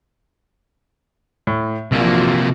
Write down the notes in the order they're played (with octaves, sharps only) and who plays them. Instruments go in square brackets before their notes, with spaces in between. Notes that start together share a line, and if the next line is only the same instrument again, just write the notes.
[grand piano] A2
[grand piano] A#1 [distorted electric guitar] C3 A#3 [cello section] E3 F3 F#4